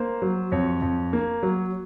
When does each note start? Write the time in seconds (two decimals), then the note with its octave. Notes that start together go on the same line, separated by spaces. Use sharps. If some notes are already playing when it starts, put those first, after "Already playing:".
Already playing: A#3 C5
0.22 F#3
0.52 F2 C#5
0.82 F2
1.13 A#3
1.43 F#3